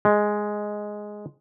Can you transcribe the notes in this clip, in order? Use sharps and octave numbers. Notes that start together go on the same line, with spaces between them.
G#3